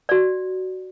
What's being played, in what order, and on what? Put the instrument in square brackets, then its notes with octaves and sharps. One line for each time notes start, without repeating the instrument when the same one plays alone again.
[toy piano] F#4 D5